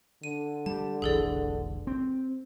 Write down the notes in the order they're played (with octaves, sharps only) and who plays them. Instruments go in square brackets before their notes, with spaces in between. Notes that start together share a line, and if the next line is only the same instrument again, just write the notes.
[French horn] D3 [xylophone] D#7
[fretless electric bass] G3 [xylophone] A5
[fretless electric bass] F1 B1 E3 [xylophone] G#4 A4 D5
[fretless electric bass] C4